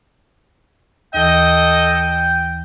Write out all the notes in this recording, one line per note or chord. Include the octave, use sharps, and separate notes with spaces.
D#2 E3 A4 D#5 G5